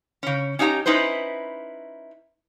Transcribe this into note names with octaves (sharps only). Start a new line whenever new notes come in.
C#3 C#4
C#4 D#4 G4 E5 A#5
C#4 D#4 E4 B4 C5